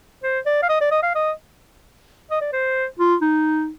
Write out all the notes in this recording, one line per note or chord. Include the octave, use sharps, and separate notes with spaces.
C5
D5
F5
D#5
D5
D#5
F5
D#5
D#5
D5
C5
F4
D#4